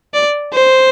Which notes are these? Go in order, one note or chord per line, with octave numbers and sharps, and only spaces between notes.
D5
C5